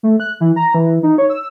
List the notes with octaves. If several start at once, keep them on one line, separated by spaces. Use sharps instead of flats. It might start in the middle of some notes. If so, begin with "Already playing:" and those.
A3
F#6
E3
A#5
E3
E3
D#4
C#5
E6